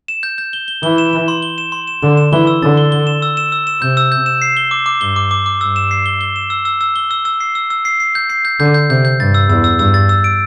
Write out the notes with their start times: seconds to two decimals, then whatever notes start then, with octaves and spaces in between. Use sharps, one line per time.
0.08 E7
0.23 G6
0.38 G6
0.53 G7
0.68 G7
0.83 E3 G7
0.98 E7
1.13 E7
1.28 C6
1.42 G7
1.58 E7
1.72 C6
1.87 E7
2.02 D3 E7
2.18 E7
2.32 E3 G7
2.47 E6
2.62 D3 A6
2.77 G7
2.92 G7
3.07 E7
3.22 E6
3.37 E7
3.52 E6
3.67 E7
3.82 C3 G6
3.97 E6
4.12 G6
4.26 E7
4.42 C7
4.57 G7
4.71 D6
4.86 D6
5.01 G2 G7
5.16 D6
5.31 D6
5.46 D6
5.61 G2 E6
5.76 E7
5.91 C7
6.06 G7
6.21 G7
6.36 E7
6.50 E6
6.65 E6
6.81 E6
6.96 G7
7.11 E6
7.25 E6
7.40 C7
7.55 E6
7.70 E6
7.85 C7
8.00 C7
8.15 G6
8.30 C7
8.45 G6
8.60 D3 G6
8.74 G6
8.90 C3 G6
9.05 G6
9.20 G2 A6
9.35 E6
9.49 E2 E6
9.64 E6
9.79 G2 E6
9.94 A6
10.09 E6
10.24 D7